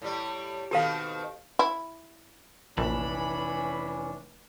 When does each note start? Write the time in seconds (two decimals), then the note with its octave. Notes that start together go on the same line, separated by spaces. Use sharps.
0.02 A2 G3
0.71 B2 D#3 C4 G4 A4 F5
1.59 E4
2.77 F1 A#1 E3 C#4 D4 A5 B5